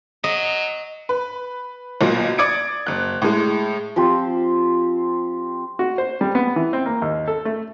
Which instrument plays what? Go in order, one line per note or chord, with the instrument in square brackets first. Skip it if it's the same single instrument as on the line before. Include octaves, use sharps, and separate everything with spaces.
[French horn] F#3 [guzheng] D#5
[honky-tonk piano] B4
B1 A#2
D5 D6 D#6 G#6 C#7 D7
F#1 F#6
A2 G#3
[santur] F3 C4 G4 C5
[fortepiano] F#4
C5
G3
B3
E3
C4
A#3
D#2
A4
A3